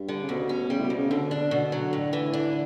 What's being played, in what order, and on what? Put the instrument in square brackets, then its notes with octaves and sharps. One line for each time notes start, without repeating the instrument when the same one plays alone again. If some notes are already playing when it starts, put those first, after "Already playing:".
Already playing: [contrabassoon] G2
[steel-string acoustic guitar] D3
[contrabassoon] C#3
[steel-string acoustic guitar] D2 [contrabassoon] B2
[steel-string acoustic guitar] C#4
[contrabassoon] C#3 [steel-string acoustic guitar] G3
[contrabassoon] A2
B2
[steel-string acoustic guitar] D2
[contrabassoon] C#3
[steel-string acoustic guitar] B2 [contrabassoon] D3
[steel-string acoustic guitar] D4
[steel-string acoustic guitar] B2 [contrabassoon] D3
[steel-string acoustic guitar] F#3
A2
E3
[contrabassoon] D3 [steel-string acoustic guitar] D4